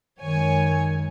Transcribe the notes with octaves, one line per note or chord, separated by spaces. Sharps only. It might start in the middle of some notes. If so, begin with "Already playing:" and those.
F#2 D#3 G#3 C#5 G#5